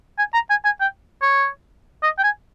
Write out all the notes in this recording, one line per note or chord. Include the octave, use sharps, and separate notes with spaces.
G#5
A#5
G#5
G#5
G5
C#5
D#5
G5
G#5